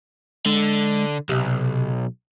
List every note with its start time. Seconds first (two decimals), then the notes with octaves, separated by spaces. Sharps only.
0.46 D3 G#3
1.29 B1 C3